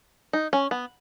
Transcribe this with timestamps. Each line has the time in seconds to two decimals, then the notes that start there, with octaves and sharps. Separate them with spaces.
0.33 D#4
0.53 C#4
0.71 B3